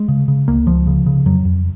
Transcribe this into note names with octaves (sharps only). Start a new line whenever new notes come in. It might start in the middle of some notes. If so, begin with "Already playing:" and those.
Already playing: G#3
C#3
C#3
C#2 A#3
C#2 F3
C#3
C#3
F2 F#3
F2